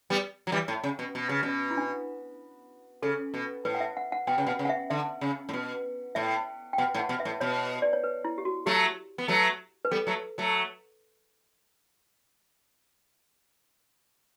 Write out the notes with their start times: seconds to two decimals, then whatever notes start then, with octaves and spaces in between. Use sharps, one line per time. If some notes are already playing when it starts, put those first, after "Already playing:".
0.10 G3 B3
0.47 F#3
0.52 E3 G3
0.68 A2
0.84 C#3
0.99 B2
1.15 B2
1.29 C#3
1.43 B2
1.71 E4
1.77 D4
3.02 C#3 A4
3.34 B2
3.65 A2 B4
3.75 F#5
3.80 E5
3.97 F#5
4.12 F#5
4.27 B2 G5
4.38 C#3
4.46 B2 F#5
4.59 C#3
4.65 F#5
4.69 E5
4.90 D3 E5
5.21 C#3
5.49 A2
5.53 B2
6.15 A2 E5
6.73 G5
6.78 B2 F#5
6.94 A2
6.99 F#5
7.09 B2
7.20 E5
7.25 A2
7.40 B2 C#5
7.82 D5
7.93 C#5
8.04 B4
8.25 E4
8.38 G4
8.45 F#4
8.66 F#3 A3 G4
9.18 B3
9.28 F#3 A3
9.85 B4
9.91 G3 B3 A4
10.07 F#3 A3
10.38 F#3 A3